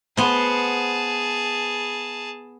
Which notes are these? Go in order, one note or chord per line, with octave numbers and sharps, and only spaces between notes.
B3 G#4 C5 A5